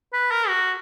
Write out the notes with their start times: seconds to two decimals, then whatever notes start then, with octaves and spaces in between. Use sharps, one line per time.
0.13 B4
0.31 A#4
0.48 F#4